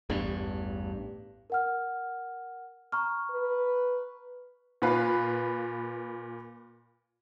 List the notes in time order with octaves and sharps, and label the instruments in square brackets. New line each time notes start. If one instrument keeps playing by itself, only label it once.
[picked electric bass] A1 E2 G2
[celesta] A#4 F#5 F6
A#5 C#6 F6
[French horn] B4
[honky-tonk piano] A#2 B4 F5